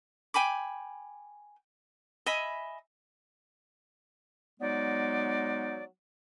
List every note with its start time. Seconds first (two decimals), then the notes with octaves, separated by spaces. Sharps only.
0.34 G5 G#5 B5 D6
2.26 D#5 E5 G#5 B5
4.60 F#3 G#3 B3 D#4 D5